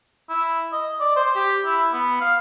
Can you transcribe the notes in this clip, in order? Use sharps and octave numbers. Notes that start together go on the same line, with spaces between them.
E4
D#5
D5
C5
G4
E4
B3
F5